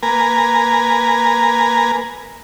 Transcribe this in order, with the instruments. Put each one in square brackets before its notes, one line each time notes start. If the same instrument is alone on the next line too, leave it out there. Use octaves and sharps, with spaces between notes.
[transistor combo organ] A#3 B4 G#5 A#5